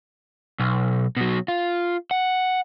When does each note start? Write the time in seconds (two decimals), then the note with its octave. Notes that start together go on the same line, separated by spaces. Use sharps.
0.60 B1
1.17 B2 F#3
1.48 F4
2.11 F#5